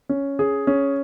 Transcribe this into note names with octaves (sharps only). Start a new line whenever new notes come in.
C#4
G#4
C#4